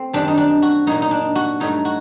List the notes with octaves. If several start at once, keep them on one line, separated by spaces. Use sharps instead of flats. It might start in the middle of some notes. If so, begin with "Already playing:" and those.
Already playing: A3 C4
F#2 D#3 G3 D4
D#4
D4
F#4
A#2 F#3 A#3 D#4
D#4
D4
F#4
G2 F#3 A3 D#4
F#4